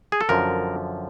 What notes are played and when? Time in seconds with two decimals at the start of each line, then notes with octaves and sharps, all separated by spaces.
0.12 G#4
0.21 A4
0.29 F#2 D3 F3 A#4